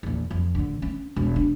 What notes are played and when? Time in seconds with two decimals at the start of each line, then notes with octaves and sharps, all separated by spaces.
0.03 A#1 E2
0.31 F2
0.55 D1 D3
0.82 C#4
1.16 E1
1.36 D4